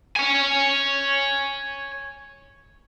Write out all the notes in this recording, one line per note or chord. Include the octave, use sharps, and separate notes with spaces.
C#5 G#5